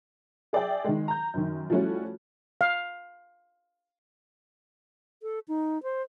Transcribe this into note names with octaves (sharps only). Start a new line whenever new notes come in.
G#4 D5 E5 G5
D#3 G#3
A#5 G6
F#2 D#3
F3 G3 A3 C#4 E4 F#4
F5
A4
D#4
C5